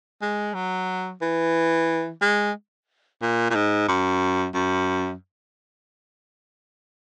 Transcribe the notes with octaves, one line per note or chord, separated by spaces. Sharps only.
G#3
F#3
E3
G#3
A#2
A#2
G#2
F#2
F#2